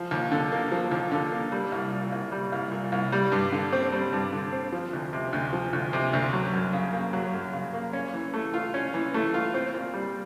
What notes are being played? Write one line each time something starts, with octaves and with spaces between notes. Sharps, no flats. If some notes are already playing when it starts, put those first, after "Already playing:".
Already playing: F3
D#2
D3
A#3
F3
D#2
D3
A#3
G3
C2
A#2
C2
G3
C2
A#2
C2
G3
G2
D3
C4
G3
G2
D3
C4
F3
D2
C3
D2
F3
D2
C3
D2
F#3
F#2
C#3
A#3
F#3
F#2
C#3
A#3
C#4
E3
A3
F4
C#4
E3
A3
F4
C4
A#2
G3